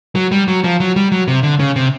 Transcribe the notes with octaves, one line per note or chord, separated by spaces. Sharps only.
F#3
G3
F#3
F3
F#3
G3
F#3
C3
D3
C#3
C3